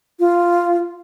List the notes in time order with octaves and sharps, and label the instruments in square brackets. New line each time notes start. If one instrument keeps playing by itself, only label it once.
[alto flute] F4